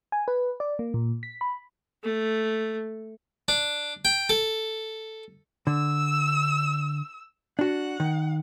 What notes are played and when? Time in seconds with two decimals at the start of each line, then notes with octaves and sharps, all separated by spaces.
0.12 G#5
0.28 B4
0.60 D5
0.79 A#3
0.94 A#2
1.23 B6
1.41 B5
2.03 A3
3.48 D4
4.05 G5
4.29 A4
5.67 D3 E6
7.59 D4 F#4 F#5
8.00 D#3